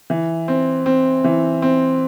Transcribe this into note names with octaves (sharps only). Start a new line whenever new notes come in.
E3
C4
C4
E3
C4